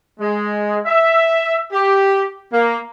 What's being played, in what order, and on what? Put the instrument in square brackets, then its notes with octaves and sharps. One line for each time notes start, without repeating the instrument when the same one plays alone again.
[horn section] G#3
E5
G4
A#3